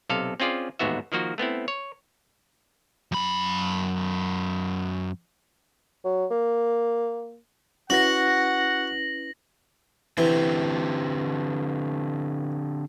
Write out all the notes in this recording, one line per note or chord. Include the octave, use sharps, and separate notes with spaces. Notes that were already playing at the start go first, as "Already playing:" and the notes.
B1 C3 A4 F5
C4 C#4 F4 G#4 D5
A1 D#2 G#2 B3 F#4 E5
D#3 F3 A#3 F#4
A3 B3 C4 E4
C#5
F#2 B5
F#3
A#3
C#4 E4 F#4 B4 F#5 A#6 F#7
D3 E3 C4 G4